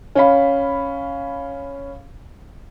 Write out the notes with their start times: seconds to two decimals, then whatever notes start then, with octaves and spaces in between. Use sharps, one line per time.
0.15 C#4 F5 B5